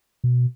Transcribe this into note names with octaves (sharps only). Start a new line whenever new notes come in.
B2